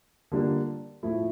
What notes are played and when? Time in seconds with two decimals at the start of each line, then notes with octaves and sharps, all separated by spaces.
0.32 D3 G3 A#3 D4 F4
1.03 A2 F3 A3 E4